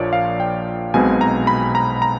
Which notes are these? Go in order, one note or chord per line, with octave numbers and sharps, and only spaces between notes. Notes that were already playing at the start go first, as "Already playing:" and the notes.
Already playing: A#1 A#2 F3 C#5 D5
F5
G5
B1 B2 G#3 C4 G#5
A#5
B5
A#5
A#5